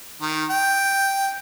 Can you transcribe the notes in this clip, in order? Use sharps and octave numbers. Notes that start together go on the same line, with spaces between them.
D#3
G5